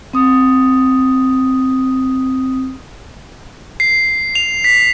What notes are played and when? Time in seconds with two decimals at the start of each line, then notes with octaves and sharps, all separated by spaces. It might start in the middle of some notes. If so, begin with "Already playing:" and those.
0.13 C4 D#6
3.80 C7
4.35 F7
4.64 B6